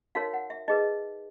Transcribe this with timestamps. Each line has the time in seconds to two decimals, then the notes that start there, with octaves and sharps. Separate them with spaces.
0.15 D#4 F#4 A#4 C#5 F5
0.33 F#5
0.50 E5
0.68 D#4 G#4 B4 D#5